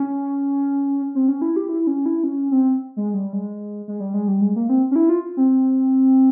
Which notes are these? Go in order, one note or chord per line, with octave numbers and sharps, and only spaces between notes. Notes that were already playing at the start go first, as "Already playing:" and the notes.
Already playing: C#4
C4
C#4
E4
G4
E4
C#4
E4
C#4
C4
G#3
G3
G#3
G#3
G3
G#3
G3
G#3
A#3
C4
C#4
E4
F4
C4